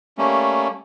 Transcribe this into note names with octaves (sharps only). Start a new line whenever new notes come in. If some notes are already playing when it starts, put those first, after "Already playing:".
G3 A3 A#3 C#4